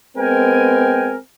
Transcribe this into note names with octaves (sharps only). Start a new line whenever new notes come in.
G#3 B3 C4 A#4 G5 G#5